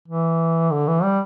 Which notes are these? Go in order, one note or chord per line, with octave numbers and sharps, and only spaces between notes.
E3
D3
E3
G3